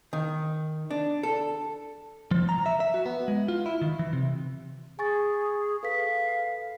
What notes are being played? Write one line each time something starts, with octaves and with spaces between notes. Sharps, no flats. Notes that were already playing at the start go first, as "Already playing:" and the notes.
D#3
D4
A4
F3
A#5
E5
E5
F#4
B3
G#3
F4
E4
D#3
E3
C3
G#4 G#5 C#6 A6
A4 B4 F5 B6